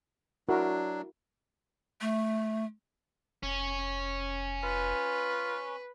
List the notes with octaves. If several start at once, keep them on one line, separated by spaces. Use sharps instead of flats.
F#3 D4 E4 F#4 A#4
A3
F1 C#4
F4 B4